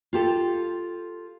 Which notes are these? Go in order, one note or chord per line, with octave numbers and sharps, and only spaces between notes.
F4 G4 A4